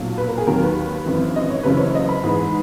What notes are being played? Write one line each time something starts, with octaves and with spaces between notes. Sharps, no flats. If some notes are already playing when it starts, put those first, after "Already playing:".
Already playing: B1 A#2 F#3
B4
A#4
G#4
D#2 D#3 F#3 A#3 A#4
B4
G#1 F#2 E3
D#5
C#5
F#1 F#2 C#3 E3 B4
C#5
D#5
B5
G#2 E3 G#3